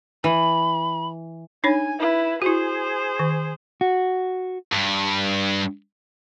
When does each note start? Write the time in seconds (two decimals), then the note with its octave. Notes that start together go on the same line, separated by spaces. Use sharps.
0.24 E3 B5
1.64 D4 D#4 C#5 G#5
1.99 E4 B4
2.42 E4 F#4 G#4 C5
3.19 D#3
3.81 F#4
4.73 G2